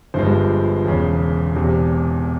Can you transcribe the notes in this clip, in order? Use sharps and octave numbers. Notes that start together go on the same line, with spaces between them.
G1 G2 F3 G#3 C5
E1 E2 C#3
E1 E2 C3